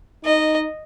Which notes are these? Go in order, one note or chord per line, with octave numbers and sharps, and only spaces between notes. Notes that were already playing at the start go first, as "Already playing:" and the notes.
D#4 D#5